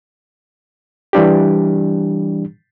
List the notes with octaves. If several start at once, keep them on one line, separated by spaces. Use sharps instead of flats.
E3 G3 D4 G4